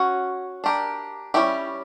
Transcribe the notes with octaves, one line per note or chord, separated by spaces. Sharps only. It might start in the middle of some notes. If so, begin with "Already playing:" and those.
Already playing: C#4 F#4 C#5
D4 G4 A#4
G3 C#4 E4 G4